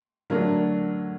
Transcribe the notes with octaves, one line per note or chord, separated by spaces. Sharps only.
D3 F#3 A3 D4 A#4